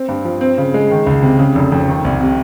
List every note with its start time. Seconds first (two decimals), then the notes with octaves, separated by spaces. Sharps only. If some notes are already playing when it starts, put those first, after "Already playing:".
Already playing: C4
0.08 G2
0.25 F3
0.41 C4
0.58 C#3
0.74 G#3
0.91 D#3
1.06 C#2
1.23 C3
1.39 C#3
1.55 F1
1.72 F2
1.88 D#3
2.05 C2
2.21 C3